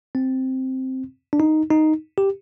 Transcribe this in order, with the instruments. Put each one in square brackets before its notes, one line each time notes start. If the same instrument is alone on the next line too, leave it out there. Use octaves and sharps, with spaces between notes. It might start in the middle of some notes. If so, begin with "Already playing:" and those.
[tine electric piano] C4
D4
D#4
D#4
G4